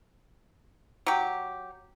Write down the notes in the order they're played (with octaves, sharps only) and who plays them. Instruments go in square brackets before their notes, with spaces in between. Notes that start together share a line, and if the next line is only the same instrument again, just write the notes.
[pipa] F#3 G4